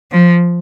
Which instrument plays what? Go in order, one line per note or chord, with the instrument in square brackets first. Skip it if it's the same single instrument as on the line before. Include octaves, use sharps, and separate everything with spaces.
[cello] F3